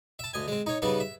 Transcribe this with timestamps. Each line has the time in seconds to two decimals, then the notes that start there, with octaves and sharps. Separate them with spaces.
0.19 E5 A5
0.33 D2 D#5 G#5
0.48 G#3 C4
0.66 D#4 C#5
0.82 C#3 G3 B3 D#4
1.00 E5